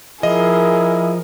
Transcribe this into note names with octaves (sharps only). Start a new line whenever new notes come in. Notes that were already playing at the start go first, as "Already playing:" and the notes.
F3 E4 G#4 A#4 D#5